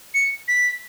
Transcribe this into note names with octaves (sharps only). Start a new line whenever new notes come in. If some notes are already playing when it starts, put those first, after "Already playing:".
C#7
B6